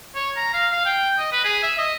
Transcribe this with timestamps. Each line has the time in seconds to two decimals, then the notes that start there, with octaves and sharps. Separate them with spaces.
0.15 C#5
0.37 A#5
0.54 F5
0.72 F5
0.86 G5
1.19 D#5
1.32 B4
1.44 G#4
1.63 E5
1.78 D#5